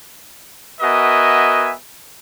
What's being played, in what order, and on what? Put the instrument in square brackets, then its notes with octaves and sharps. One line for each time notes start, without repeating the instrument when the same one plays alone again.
[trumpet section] B3 F#4 A#4 D#5 E5 G#5